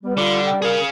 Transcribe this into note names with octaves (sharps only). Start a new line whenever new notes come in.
G3 B3
D3 F4
G5
G#4 A#4 F5